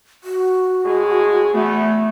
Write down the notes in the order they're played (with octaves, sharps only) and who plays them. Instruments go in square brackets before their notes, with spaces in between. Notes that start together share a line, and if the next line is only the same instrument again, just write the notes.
[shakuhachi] F#4
[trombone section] A2 G#3 G#4
[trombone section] E2 B3 [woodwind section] A3